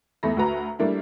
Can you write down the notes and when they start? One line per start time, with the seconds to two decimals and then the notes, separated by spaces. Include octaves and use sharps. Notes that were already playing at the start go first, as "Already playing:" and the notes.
0.23 E2 A3 B5 A#6
0.37 D2 F#4 B4 A#5
0.79 G3 A3 A#3 D4 E4